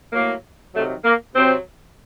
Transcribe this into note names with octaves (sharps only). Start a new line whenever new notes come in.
A2 F#3 A#3
C3 D#3 F#3 A3
A#3
C3 F#3 C4